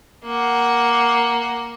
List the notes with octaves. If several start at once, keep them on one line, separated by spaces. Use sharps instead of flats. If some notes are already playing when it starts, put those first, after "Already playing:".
A#3 F#5